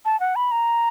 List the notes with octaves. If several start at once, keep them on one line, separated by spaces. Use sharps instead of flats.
A5
F#5
B5
A#5